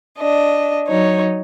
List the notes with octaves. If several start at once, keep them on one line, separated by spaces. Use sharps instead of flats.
D4 D#5
F#3 D#4 C#5